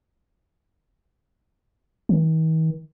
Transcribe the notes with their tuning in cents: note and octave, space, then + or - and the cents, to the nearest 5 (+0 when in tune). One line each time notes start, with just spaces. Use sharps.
D#3 +45